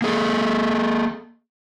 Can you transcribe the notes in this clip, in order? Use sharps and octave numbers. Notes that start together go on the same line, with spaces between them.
A#3 G#4 A4